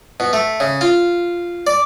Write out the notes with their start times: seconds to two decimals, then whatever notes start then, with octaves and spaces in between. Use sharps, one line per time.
0.20 B2
0.33 A3
0.60 C#3
0.81 F4
1.67 D5